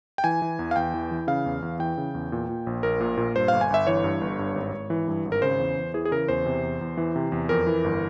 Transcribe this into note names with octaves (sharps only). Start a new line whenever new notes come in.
G5
E3 G#5
E3
E2
F5
E2 G5
E3
E3
C#3 F5
E2
E2
E3 G5
C#3
E2
A#2
A#2
A#1
A#1 A#4
A#2
A#2
G2 C5
G1 F5
G#5
G1 E5
E3 C#5
G2
G1
G2
G#1
G#1
E3
G2
G#1
A#4
C#3 C5
E2
E2
E3 G#4
G#4
C#3 A#4
E2 C5
C3
E2
E2
E3
C3
E2
F2 A#4
E3
G1